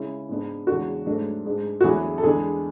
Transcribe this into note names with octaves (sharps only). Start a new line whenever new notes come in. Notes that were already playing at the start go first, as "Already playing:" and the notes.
Already playing: C#3 G#3 C#4 E4
G#2 G#3 B3 D4
E2 C#3 G#3 D4 F#4
G#2 F#3 A3 D4
G#2 G#3 D4
F#4
E2 D3 F#3 B3 E4 G#4
A4
E2 D3 G#3 B3 D4 G#4